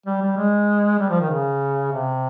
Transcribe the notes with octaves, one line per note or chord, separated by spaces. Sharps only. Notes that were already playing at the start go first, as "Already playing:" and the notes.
G3
G3
G#3
G3
F3
D#3
C#3
C3